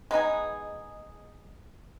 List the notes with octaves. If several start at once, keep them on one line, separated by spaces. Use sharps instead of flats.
G#3 B3 D#4 G#4